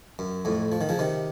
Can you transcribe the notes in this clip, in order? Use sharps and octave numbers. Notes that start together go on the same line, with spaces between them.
F#2
F2 A2
F3
D#3
C#3 F3
C3 D#3